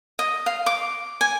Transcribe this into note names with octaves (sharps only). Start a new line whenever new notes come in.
D#5
F5
D6
G#5